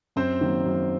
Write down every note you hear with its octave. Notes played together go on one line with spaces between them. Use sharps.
F#2 C4 C5
D#3 F#3 A#3
F#2